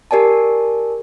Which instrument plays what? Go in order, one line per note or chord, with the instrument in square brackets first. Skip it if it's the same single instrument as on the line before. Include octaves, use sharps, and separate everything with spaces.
[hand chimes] G4 A#4 D5 G#5 A5